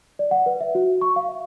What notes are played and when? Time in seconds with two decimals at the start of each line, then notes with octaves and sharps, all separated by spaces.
0.19 D5
0.31 F#5
0.46 B4
0.61 E5
0.75 F#4
1.01 C#6
1.16 F5
1.29 E5